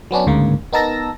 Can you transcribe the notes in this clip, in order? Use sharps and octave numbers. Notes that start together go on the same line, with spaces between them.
F#3 B3 C#4 D4
D2 G#2 C#3 A#3
B3 D#4 A#4 A5 E6 A#6